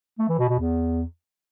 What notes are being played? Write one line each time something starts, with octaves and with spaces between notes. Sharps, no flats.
A3
E3
B2
B2
E2